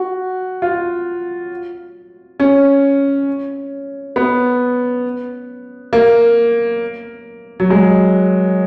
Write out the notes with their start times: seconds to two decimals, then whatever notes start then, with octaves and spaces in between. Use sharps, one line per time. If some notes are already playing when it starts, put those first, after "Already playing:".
Already playing: F#4
0.62 F4
2.40 C#4
4.16 B3
5.93 A#3
7.60 F#3
7.70 G#3